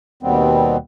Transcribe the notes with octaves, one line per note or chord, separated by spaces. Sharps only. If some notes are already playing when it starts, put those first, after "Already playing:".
D#2 B2 D#3 G3 B3 C4